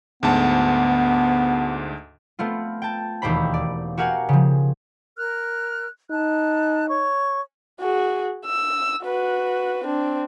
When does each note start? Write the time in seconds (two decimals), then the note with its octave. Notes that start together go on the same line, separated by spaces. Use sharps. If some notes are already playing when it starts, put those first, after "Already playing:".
0.23 D2 G#2 B3 A5
2.39 A3 B3 C4 F4
2.82 G5 A5
3.22 E1 D#2 C4 G4 C5 B5
3.54 D5
3.97 F#4 G4 A#4 F5 F#5 G#5
4.29 C#3 F3
5.17 A#4 F6 F#6
6.11 D#4 A5 F#6
6.89 C#5 C#6
7.80 F#4 G#4
8.46 E6
9.03 F#4 B4
9.85 C4 D4